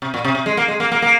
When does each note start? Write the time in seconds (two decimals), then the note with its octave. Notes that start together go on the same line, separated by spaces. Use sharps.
0.02 C3
0.14 A#2
0.25 C3
0.35 C3
0.46 G#3
0.57 A#3
0.68 G#3
0.80 A#3
0.92 A#3
1.02 A#3